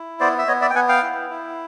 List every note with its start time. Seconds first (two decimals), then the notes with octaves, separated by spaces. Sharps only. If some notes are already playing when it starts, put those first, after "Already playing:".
Already playing: E4
0.20 B3 C5 D5
0.38 E5
0.48 B3 C#5 D#5
0.62 D5 E5
0.70 G5
0.75 B3 F#5 G#5
0.89 F5 G5
1.03 E4
1.30 E4